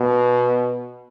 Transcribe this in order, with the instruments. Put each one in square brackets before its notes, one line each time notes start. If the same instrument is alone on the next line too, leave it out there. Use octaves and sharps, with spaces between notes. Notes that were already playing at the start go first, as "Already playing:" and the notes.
Already playing: [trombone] B2